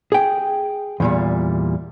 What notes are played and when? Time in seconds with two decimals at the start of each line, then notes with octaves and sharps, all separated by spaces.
0.12 G#4 G5
1.00 E2 A#2 G3